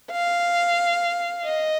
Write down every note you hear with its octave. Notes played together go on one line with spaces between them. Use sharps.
F5
D#5